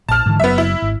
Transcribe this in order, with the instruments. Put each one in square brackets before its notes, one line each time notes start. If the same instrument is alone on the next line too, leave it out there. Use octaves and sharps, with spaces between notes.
[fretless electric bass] A#1 [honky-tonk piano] A5 F6
[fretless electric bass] G#2 D3 E3
[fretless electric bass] F#1 F#3 [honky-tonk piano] B3 E5
[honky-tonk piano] E4
[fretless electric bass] G#1